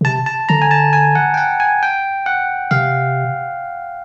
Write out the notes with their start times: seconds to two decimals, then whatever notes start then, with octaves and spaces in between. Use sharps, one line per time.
0.01 C#3
0.05 C3 A5
0.26 A5
0.49 D3 A#5
0.62 G#5
0.71 A5
0.93 G#5
1.15 F#5
1.34 G5
1.38 F#5
1.60 G#5
1.83 G5
2.26 F#5
2.71 C3 F5